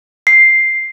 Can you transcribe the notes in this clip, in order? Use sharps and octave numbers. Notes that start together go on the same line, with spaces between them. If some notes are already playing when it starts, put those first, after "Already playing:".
C7